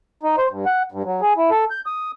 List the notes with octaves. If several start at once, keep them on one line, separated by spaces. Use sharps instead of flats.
D#4
C5
G2
F#5
G2
F#3
G#4
E4
A4
G6
D#6